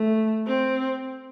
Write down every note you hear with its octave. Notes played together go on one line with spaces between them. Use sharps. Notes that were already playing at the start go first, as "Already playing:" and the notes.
Already playing: A3
C4